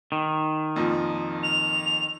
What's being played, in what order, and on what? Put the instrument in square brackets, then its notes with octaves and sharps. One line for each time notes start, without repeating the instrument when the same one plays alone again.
[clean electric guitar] D#3
[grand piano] F2 A#2 F3
[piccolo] F7